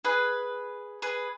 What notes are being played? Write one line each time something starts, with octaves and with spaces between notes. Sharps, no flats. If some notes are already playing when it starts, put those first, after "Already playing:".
G#4 B4
G#4 B4